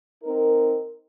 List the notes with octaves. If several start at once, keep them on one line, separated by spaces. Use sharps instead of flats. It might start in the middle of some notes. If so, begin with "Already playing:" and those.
C4 D#4 A#4